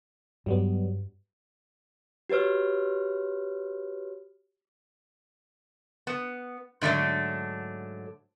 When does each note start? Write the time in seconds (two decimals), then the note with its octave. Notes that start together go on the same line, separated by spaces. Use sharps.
0.46 G2 F#3 G3 B3
2.30 F#4 G4 B4 C#5 F6
6.07 B3
6.81 G#2 D3 F#3 A3 D4